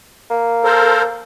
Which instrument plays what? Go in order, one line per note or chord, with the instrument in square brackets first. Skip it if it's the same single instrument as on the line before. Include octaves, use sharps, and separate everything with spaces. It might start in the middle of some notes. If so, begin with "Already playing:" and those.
[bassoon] A#3
[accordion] A4 A#4 C5